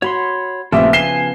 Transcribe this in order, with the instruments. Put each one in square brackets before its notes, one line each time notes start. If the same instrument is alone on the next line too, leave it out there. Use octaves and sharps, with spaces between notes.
[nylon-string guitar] F#4 [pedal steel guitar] C#5 B5 C6
[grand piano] A#1 E5 [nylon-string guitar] C#3 F3 B3 [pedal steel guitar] A3 C4 G4
[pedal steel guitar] G#5 [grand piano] C7 E7 G7